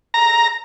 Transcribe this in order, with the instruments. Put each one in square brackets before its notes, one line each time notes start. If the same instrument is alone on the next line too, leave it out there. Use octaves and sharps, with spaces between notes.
[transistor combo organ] A#5